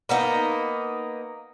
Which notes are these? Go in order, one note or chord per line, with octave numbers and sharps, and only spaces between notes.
A#3 B3 D#4